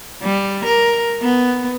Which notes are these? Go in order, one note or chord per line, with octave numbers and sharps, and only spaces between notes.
G3
A#4
B3